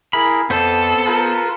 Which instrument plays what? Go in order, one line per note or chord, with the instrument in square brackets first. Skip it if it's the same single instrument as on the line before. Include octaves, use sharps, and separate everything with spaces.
[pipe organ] E4 G#4 A#4 [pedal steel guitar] B5
[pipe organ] F2 [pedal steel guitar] B3 C5 [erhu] A4
[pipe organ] F4 A#4 B4